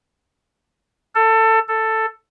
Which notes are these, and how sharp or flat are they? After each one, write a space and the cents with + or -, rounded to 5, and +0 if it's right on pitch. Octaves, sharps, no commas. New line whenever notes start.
A4 +20
A4 +10